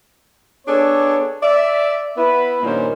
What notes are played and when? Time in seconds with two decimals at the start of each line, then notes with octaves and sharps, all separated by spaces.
0.66 B3 D4 G#4 A4 C#5
1.42 D5 E5
2.16 B3 E4 B4
2.63 G2 A#2 D#3 A#3 C#4 C5